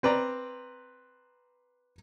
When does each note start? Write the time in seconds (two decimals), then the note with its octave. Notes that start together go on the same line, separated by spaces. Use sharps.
0.03 C4 B4 D5 A#5